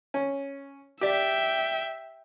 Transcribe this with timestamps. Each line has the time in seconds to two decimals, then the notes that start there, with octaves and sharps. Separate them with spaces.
0.14 C#4
1.01 G4 D5 E5 G5